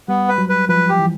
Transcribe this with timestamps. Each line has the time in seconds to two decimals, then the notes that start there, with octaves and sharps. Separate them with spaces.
0.08 G3 B3
0.28 B4
0.38 F#3
0.49 B4
0.69 F3 B4
0.89 G4
0.99 E3